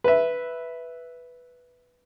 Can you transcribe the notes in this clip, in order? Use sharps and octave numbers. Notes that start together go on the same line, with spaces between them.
B4 E5